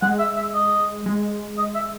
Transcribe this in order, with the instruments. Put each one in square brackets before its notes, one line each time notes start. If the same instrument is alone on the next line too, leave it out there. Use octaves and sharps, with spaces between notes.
[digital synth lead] G#3 [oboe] F#5
[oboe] E5
E5
D#5
[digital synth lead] G#3
[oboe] D#5
E5